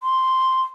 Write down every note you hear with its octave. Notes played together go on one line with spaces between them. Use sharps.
C6